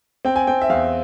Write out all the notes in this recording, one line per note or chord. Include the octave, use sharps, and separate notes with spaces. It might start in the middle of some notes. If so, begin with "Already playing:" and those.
C4 G5
G#5
C4 G5
E5
E2 F5